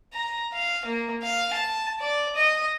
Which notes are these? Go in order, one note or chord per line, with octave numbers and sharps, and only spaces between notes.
A#5
F5
A#3
F5
A5
D5
D#5